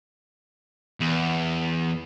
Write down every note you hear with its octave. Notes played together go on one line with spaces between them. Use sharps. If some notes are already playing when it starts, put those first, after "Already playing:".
E2